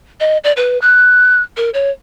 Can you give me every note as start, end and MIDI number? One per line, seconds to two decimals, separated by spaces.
0.20 0.38 75
0.44 0.52 74
0.56 0.80 71
0.82 1.41 90
1.57 1.70 70
1.74 1.91 73